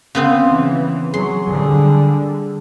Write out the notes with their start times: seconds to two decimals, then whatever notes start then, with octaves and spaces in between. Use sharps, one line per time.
0.15 C#3 B3 C4
0.51 E3
1.14 F#3 G#4 C6
1.48 D3 G3